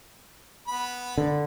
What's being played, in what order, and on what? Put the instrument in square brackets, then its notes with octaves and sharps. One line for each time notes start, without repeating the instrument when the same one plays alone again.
[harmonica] B3 B5
[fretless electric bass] D3